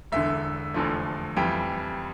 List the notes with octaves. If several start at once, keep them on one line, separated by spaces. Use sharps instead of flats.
E1 E2 D3 E5
F1 E2 D3 F3 A3
F2 E3 G3 G5